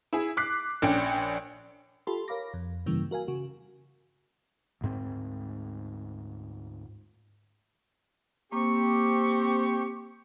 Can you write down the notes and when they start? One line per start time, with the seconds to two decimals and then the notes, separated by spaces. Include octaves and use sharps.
0.13 E4 G#4
0.37 D6 F#6 B6 C7
0.82 A#1 C#4 D4 G5
2.07 F4 G4 A4 A5 B5 C6
2.28 A#4 C#5 F5 B5 D6 A#6
2.54 F2
2.86 G2 C#3 E3 G3 A#3
3.11 F#4 A#4 F5 G#5
3.28 C#3 F#4
4.81 D2 G#2 C4
8.52 A#3 C4 G4 C#6